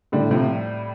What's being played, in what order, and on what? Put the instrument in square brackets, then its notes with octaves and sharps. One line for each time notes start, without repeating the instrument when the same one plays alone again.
[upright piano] A2 D3 [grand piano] G3
[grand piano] A2 [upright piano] C3 F3